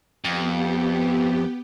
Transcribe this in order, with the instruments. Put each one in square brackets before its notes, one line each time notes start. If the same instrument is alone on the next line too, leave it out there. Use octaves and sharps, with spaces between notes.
[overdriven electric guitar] F2 [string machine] B3 G4